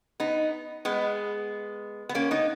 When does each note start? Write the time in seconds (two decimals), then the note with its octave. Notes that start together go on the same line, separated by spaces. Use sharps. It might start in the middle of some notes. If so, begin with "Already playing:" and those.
0.20 B3 D#4
0.85 G#3 B3
2.09 B3
2.15 A#3 C#4
2.31 B3 D#4